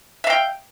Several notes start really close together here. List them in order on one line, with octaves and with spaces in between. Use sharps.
E5 F5 G5